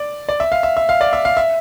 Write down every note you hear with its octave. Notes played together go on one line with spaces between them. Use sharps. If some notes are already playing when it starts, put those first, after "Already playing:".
Already playing: D5
D5
E5
F5
E5
E5
F5
D5
E5
F5
E5